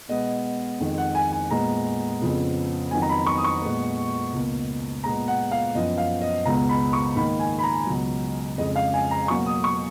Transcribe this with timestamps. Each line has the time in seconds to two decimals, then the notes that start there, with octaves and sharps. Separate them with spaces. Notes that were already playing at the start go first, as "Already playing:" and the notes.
0.08 B2 G#3 B3 D#5
0.80 F2 D#3 G#3
0.98 F#5
1.15 G#5
1.32 G#5
1.51 A#2 G#3 B3 A#5
2.21 F2 C#3 F3 B3
2.91 F2 D#3 F#3 B3 G#5
3.02 A#5
3.09 B5
3.26 C#6
3.37 D#6
3.44 C#6
3.62 A#2 G#3 B3
4.33 C#2 B2 A#3
5.04 A#2 G#3 B3 A#5
5.28 F#5
5.51 F5
5.75 F#2 F3 B3 D#5
5.98 F5
6.21 D#5
6.45 C#2 B2 G#3 B3 A#5
6.69 B5
6.93 C#6
7.16 G#2 D#3 A#3 B5
7.39 G#5
7.58 B5
7.63 A#5
7.87 C#2 B2 F#3
8.57 F2 C#3 G#3 D#5
8.76 F5
8.94 G#5
9.11 A#5
9.28 B2 F#3 A#3 C#6
9.46 D#6
9.64 C#6